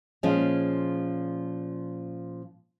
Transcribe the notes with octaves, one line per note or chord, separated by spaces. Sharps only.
A#2 F3 G#3 C#4 G#4